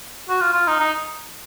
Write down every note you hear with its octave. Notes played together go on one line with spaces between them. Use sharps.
F#4
F4
F4
D#4
D#4